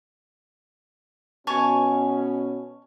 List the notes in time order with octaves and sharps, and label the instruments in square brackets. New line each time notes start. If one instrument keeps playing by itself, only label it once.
[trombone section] B2 C#4 [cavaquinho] C#5 G#5 A5